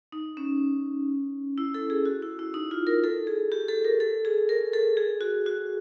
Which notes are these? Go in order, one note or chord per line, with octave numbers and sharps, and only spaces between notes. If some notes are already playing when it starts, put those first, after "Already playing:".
D#4
C#4
E4
A4
G#4
F#4
E4
E4
D#4
F4
A#4
A4
G#4
G4
A4
A#4
A4
G#4
A#4
A4
G#4
F#4
F#4